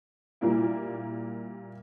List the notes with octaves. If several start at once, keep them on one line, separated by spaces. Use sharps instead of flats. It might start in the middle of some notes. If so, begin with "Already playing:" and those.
A#2 G3 A#3 E4